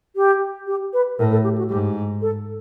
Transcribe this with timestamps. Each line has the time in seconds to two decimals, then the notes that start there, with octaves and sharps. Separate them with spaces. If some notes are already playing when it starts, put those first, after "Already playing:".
0.16 G4
0.67 G4
0.93 B4
1.19 A2 A#4
1.32 A4
1.44 G4
1.58 F#4
1.70 G#2 G4
2.22 A4